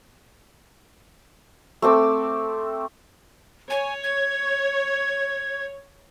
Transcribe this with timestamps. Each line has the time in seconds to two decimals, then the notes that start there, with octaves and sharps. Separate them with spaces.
1.82 A3 C4 D6 E6
3.70 C#5 G#5
4.04 G#6